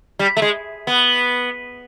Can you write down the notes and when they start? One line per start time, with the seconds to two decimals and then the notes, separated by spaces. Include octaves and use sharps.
0.19 G3
0.37 A3
0.42 G#3
0.87 B3